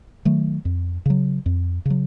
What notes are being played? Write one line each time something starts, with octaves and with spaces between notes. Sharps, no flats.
D#3 F#3 A3
F2
C#3 F#3
F2
C#3 F#3